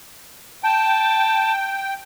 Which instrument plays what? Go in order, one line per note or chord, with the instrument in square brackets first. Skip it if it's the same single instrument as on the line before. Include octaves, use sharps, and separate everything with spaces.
[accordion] G5 [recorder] A5